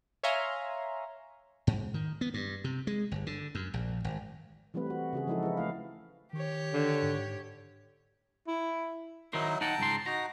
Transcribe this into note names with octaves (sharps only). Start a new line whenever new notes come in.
C#5 E5 F5 G#5 A#5 C6
G#2
D#3
B3
G2
C3
G#3
G1
D3
F#2
A#1
G#1
E3 G3 A3 C4 B4
A3 F#4
C#3 F#4 G#4
F3 G#3 D#4 E4 F#4 A4
E4 G#4 B4
A3 E4 F5
D#3 G4 C#5
D3
G#2
E4
D#3 F#3 D#4 E4 A#4 C5
D#4 F#5 G5 A5 A#5
C#2 G#2 C6
D#4 F#4 A#5